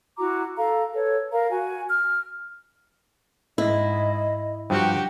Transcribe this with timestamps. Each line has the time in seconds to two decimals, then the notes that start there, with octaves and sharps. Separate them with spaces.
0.17 E4 F#4 A#5 D6
0.57 A4 F5 A#5
0.94 A4 B4 C#5
1.31 A#4 F5 A#5
1.50 F#4 G#5
1.89 F6
3.58 G#2 E4 D#5
4.70 G2 F3 F#4 G4 G5